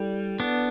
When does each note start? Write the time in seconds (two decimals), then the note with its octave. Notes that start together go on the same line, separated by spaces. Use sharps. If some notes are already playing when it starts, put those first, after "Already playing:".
Already playing: G3 E4 A4 D5
0.40 B3 D4